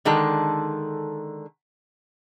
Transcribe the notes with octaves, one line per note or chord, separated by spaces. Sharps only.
D3 D#3 G#3 A4